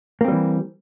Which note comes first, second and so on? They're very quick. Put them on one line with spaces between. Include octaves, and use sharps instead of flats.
A#3 C4 G3 E3